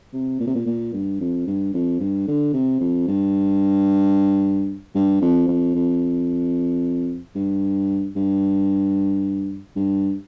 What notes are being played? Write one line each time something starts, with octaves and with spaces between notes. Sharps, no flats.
C3
A#2
C3
A#2
A#2
G2
F2
G2
F2
G2
D3
C3
F2
G2
G2
F2
F2
F2
G2
G2
G2